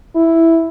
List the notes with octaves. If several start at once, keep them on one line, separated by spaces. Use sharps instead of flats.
E4